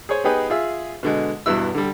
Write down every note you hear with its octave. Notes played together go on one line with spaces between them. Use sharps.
G#4 C5 C#5 G#5
B3 D#4 G4 G#4 B4
F4 G#4 E5
B2 D3 G#3
E2 G2 B2 E4 E6
D3 G3